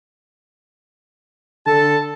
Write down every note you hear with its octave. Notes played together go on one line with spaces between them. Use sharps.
D3 A4 A5